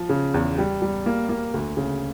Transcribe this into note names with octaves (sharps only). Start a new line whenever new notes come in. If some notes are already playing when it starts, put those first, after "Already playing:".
Already playing: F3
C#3
E2
G3
G3
A#3
A#3
D2
C#3